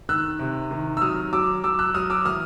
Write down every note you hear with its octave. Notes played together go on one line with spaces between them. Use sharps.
D#3 E6 F#6
C3
D#3
E6
F#3 D#6 F6
F#3 D6 E6
F#3 D6 E6
E6 F#6
F#3 D#6 F6
D6 E6
E3 D#6 F6